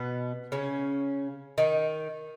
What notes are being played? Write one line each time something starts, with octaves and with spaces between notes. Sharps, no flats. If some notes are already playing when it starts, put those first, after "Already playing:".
Already playing: B2 B3
C#3 C#4
D#3 D#4